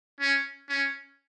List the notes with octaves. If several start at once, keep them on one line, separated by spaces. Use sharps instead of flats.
C#4
C#4